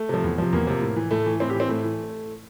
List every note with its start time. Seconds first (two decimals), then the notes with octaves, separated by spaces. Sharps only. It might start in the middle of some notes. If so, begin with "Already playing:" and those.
Already playing: A3
0.09 C3 F3
0.24 E2
0.38 C3 F3
0.53 E2 A#3
0.67 C3 F3
0.82 A2
0.96 E3
1.11 A2 A3
1.26 E3
1.40 A2 C4
1.50 G4
1.55 E3
1.60 C4
1.69 A2 A3
1.84 E3